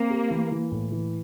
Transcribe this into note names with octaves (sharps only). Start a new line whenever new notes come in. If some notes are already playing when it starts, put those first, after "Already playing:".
Already playing: A#3 C4
G4
E3
E3
A2
E3